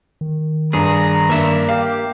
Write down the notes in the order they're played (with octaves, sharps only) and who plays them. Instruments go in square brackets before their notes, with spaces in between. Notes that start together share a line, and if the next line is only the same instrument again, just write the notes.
[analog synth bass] D#3
[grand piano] G2 [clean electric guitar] G#4 [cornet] A#5
[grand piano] G2 [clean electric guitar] A#3 E5
[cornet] G4 [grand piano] F5